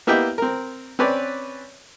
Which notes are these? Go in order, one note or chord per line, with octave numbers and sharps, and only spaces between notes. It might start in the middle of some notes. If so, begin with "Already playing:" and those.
A#3 B3 E4 G4 D#5 G5
C4 A#4
C4 C#4 B4 C#5 D5